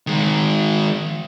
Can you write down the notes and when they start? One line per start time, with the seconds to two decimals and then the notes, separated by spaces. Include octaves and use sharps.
0.07 D#3 G#3